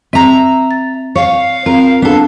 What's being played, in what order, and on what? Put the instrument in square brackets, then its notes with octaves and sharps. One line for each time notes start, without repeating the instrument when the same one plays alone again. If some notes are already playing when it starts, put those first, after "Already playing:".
[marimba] C4 [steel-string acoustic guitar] E5 A#5
[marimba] A6
[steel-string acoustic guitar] C#5 [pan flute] F5
[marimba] C4 F4 [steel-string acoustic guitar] A#4
[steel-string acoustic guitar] B3 A4 [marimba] D4